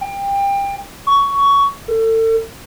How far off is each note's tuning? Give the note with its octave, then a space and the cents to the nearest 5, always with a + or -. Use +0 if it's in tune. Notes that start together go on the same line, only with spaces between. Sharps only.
G5 +25
C#6 +15
A4 +35